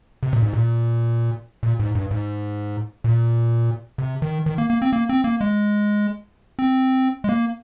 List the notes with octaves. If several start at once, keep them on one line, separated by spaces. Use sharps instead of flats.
C3
A#2
G#2
A#2
A#2
G#2
G2
G#2
A#2
C3
D#3
D#3
A#3
A#3
C4
A#3
C4
A#3
G#3
C4
G#3
A#3